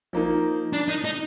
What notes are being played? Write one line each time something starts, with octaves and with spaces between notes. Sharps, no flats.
F3 A#3 D#4
D4
D#4
D#4